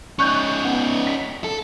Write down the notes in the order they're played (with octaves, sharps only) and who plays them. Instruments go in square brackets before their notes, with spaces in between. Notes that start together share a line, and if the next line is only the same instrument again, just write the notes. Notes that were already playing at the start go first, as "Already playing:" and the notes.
[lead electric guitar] C#4 D#4 [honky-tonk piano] C#6 F#6 G6
[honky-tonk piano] B3
B6
[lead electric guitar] A4